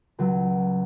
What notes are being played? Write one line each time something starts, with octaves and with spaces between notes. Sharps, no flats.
C#2 F#3